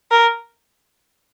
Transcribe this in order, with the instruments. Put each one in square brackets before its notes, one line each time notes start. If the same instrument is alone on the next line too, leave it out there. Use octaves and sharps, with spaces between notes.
[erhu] A#4